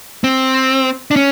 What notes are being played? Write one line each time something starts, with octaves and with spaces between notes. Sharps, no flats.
C4
D4
C#4